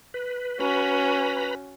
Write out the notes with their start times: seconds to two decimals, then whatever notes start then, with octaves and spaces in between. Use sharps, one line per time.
0.14 B4
0.60 C#4 F#4 B4 A#5 B5